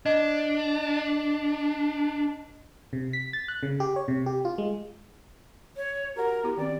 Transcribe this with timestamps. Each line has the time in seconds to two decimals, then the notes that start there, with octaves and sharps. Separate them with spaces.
0.06 D4 D#5
2.93 C3
3.13 B6
3.33 A6
3.48 F#6
3.63 C#3
3.80 G4
3.96 C#5
4.08 C3
4.26 G4
4.45 F4
4.58 G#3
5.77 C#5
6.16 F#4 G4 A#4 F#5
6.44 B3 E4 G4
6.57 D#3 C4 C#4 D5